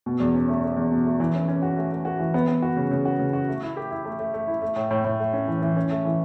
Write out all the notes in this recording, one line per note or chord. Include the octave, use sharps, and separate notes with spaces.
B2
E2
C#4
A3
A3
E2
B2
A3
E3
C#4
C#4
F#4
A3
A3
F#4
E3
B3
B3
F#4
C#3
C#3
F#4
C#3
F#4
A3
E4
G4
E4
A3
A3
A3
E4
A3
A2
A2
A2
A3
C#4
E3
E3
C#4
A3
E3